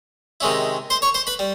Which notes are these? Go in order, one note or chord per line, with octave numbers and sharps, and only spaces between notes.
C3 D#3 G#3 C#4 E4
C5 C6
C#5 C#6
C5 C6
B4 B5
G3